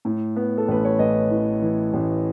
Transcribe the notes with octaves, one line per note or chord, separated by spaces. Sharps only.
A2
B3
A4
A1 B4
C#5
A1 B4 D#5
E3
E3
A1